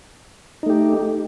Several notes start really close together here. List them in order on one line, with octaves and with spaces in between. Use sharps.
D#4 A3 G4